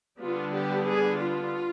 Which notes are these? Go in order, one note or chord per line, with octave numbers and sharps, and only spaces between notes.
D3 G3 B3 D4 F4
G4
G#4
F4